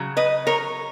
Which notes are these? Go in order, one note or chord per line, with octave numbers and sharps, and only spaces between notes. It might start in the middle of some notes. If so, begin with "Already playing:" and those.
Already playing: C#3 F#3
B4 D#5
A#4 C#5